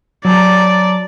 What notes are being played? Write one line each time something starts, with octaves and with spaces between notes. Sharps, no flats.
F#3 D5 A5 A#5